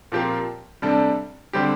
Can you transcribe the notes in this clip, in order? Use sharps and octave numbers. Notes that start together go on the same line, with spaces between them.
A#2 F3 C4 G4 A#4
C3 G3 D4 A4
D3 G3 C4 G4